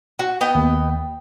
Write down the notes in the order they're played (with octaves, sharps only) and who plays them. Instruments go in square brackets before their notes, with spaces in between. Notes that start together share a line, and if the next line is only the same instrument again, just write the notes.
[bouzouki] F#4
B3 D#5 G5
[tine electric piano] D#2